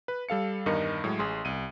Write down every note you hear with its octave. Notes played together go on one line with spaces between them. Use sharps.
B4
G3 A4 F5 C#7
E2 G2 D#3 A#4 D#5 C#7
A2 F#3 G#3
A1 G#4 C6
C2 D#7